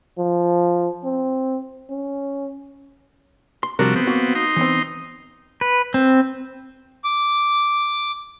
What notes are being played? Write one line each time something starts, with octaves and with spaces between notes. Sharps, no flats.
F3
C4
C#4
C6
C3 F3 G3 D4 F#4 A#4
B3 C4
A#3 F#4
D#4 C6
E3 B3 C4
B4
C4
D6